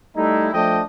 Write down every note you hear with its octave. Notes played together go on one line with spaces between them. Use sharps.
G3 A3 D#4 E4
F3 A3 D4 D#5 G5